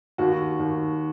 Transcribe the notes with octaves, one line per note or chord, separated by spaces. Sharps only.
D#2 F#4
D#2